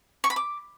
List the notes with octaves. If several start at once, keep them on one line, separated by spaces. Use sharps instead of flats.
C#6
B5
D6